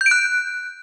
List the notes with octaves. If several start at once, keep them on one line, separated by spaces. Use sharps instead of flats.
G6
D7
F#6